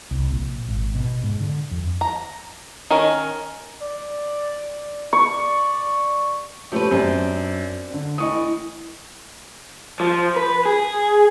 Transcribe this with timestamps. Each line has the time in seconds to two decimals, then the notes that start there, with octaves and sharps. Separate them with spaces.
0.11 C2
0.32 A#1
0.69 G#1
0.95 B2
1.24 G#2
1.40 D3
1.71 F2
2.01 A#5
2.90 D#3 C#4 A#4
3.82 D5
5.13 D5 C#6
6.72 F3 A3 C#4 G4 B4
6.91 F#2 C4 D4
7.94 D3
8.18 A2 E3 D#5 C#6 D#6
10.00 F3
10.36 B4
10.66 G#4